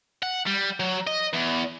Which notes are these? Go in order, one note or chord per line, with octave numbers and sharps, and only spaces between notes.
F#5
G3
F#3
D#5
E2